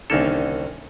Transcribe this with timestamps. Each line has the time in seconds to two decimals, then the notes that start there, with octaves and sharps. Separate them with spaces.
0.10 C2 D3 D#3 A#3 C#4 A4